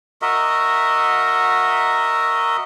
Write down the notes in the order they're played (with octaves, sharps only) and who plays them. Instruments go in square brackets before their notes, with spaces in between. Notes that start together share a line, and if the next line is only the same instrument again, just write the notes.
[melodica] F#4 A#4 D#5 E5